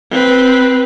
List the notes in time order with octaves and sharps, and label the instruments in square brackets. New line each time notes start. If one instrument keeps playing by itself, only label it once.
[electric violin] C4 B4